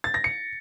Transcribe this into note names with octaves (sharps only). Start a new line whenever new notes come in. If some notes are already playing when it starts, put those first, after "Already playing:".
A6
A#6
C#7